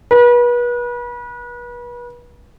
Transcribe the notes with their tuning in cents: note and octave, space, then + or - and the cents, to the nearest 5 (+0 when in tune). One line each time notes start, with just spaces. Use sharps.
B4 -35